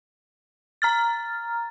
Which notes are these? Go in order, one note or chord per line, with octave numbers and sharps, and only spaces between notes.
A#5 F6 A6